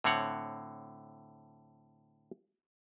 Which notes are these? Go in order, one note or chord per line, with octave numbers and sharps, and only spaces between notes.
A2 D3 C4 C#5 F#5